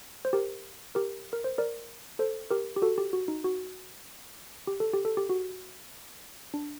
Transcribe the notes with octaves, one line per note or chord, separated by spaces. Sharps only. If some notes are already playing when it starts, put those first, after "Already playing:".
C5
G4 A#4
G4 A#4
A#4
C5
A#4 D5
A4 C5
G4 A#4
G4
F#4 A4
G4
F#4
D#4
F#4
G4
A4
G4
A4
G4
F#4
D4